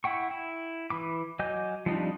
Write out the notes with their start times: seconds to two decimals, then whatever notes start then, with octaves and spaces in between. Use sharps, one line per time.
0.04 E4 F#5 G5 C#6
0.31 E4
0.90 E3 B5 D6
1.39 F#3 D#5 G#5 D6 G6
1.86 F3 G3 C4 D4 D#4